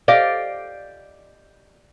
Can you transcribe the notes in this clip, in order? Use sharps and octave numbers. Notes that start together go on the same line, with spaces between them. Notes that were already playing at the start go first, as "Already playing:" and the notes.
G4 D5 D#5 F5